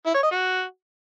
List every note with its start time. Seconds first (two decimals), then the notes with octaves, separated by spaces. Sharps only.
0.06 E4
0.15 C#5
0.23 D#5
0.32 F#4